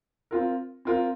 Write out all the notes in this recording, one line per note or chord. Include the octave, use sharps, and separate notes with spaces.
C4 F4 A#4
C4 F4 A#4